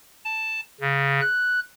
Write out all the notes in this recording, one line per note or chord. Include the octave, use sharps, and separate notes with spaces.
A5
C#3
F#6